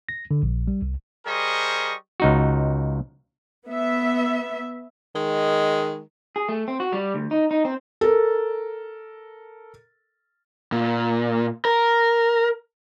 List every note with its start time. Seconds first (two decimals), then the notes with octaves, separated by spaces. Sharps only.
0.09 A#6
0.31 D3
0.43 A#1
0.68 G3
0.82 C2
1.26 G3 G#4 A#4 C5 D#5 C#6
2.20 C#2 D#4 F#4
3.68 B3 E5
5.16 D#3 G#3
6.36 G#4
6.49 A3
6.68 C4
6.80 F#4
6.92 G3
7.15 D2
7.31 D#4
7.51 D#4
7.65 C4
8.01 A4 A#4
10.72 A#2
11.65 A#4